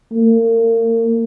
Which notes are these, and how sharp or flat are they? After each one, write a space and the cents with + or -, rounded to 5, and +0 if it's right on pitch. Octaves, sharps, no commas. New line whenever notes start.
A#3 -35